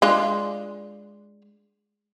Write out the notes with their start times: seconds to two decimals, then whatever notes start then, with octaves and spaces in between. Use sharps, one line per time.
0.02 G#3 D4 F4